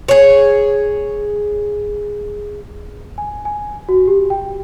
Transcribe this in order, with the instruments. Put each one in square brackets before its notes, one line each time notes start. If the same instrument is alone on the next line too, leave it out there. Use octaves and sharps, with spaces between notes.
[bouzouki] G#4 C#5
[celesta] G#5
G#5
F#4
G4
G5